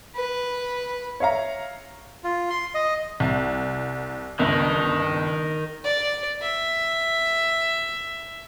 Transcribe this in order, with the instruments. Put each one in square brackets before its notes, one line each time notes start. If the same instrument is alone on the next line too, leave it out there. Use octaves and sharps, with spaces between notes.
[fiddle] B4
[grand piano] C#5 E5 F5 A#5
[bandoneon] F4
C6
D#5
[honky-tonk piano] C2
[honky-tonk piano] G1 C#2 [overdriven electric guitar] D#3
[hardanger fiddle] D5
E5